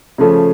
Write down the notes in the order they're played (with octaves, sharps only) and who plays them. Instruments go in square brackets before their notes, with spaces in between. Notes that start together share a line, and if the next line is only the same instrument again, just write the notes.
[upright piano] C#3 F3 A3 C#4